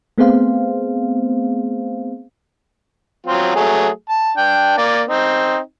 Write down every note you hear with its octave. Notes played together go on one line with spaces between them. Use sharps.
A3 B3 C4 G#4 C5 F5
F#3 C4 F4
F#3 A3 G#4
A5
D4 G5
A#3 D5
C4 D#4